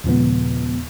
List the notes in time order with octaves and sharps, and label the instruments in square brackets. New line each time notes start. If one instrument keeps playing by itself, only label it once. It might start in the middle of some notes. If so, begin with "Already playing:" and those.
[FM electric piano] D#2 A#2 C#3 F3 G#3 B3